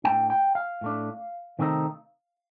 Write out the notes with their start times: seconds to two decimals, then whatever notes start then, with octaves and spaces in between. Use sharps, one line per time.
0.04 A2 A3 D4 G5
0.30 G5
0.55 F5
0.81 A2 A3 D4
1.59 C3 D#3 A3 C4 D#4